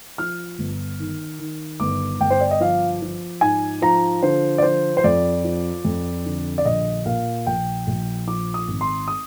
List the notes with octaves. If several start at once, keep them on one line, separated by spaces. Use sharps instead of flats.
F3 F6
G1
D#3
D#3
G1 D6
G1 G5
C5
D5
D#5
F3 F5
F3
G#2 G#5
F3 A#5
D3 C5
D5
F3 C5
C5
F2 D5
F3
F2
D3
D5
A#1 D#5
A#2 F5
A#1 G5
A#1
F3 D6
D#6
G#1
C6
D#6